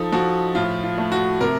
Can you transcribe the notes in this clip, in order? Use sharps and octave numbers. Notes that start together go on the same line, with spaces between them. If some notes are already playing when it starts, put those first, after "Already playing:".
Already playing: F3 D#4 A4
F3 F#4
A2 F4
F4
A3
F#4
C3 A#4